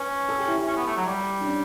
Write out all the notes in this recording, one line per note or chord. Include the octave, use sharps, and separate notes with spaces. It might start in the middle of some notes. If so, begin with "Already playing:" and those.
Already playing: C#4 B4
A4
G4
E4
E4
C#4
B3
A3
F#3
G3
D4
C#4